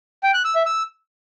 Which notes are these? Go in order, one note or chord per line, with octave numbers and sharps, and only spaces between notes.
G5
F#6
E6
E5
E6